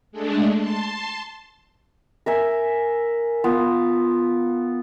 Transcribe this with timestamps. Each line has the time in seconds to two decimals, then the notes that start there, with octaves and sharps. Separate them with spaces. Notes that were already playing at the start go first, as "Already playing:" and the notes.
0.12 G#3 A3 D4
0.58 A5 C6
2.26 A#4 E5 G#5
3.44 B3 F4